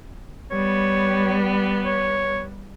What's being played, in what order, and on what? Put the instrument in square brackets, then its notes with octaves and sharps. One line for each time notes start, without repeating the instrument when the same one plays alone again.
[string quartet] G3 B3 [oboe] C#5
[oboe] C#5